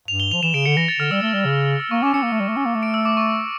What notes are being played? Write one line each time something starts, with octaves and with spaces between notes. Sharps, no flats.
G2 F7
G7
F3 F7
E3 E7
C#3 D7
D3 C#7
E3 A#6
A6
D3 F6
G3 E6
A3
G3
C#3
E6
A#3 C#6
C#4 D6
C#4 C#7
A#3
A3
G3
A3
C#4
A#3
A3
D7
E6
D6
C#6